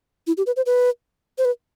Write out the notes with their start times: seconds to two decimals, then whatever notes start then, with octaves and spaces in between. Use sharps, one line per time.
0.27 E4
0.37 G4
0.47 B4
0.56 C5
0.66 B4
1.38 C5
1.45 B4